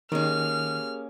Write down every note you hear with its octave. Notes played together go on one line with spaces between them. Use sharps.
D#3 A#3 C#4 G4 G#4 A#4 F6